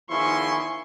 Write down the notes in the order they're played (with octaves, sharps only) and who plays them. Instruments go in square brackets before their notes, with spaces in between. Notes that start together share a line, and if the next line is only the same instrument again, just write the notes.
[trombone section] E2 D#3 F3 [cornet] E4 [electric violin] G#5 C#6 [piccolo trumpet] C6